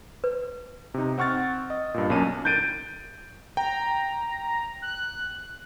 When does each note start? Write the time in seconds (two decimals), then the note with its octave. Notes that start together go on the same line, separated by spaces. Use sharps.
0.24 B4
0.94 C3 D#4
1.18 C4 F#5 C#6 F6 A6
1.70 D#5
1.94 G2 A#2
2.10 B1 A#3 C#4 A5 D#7
2.45 G6 A6 D7 D#7
3.57 G5 A#5
4.82 F#6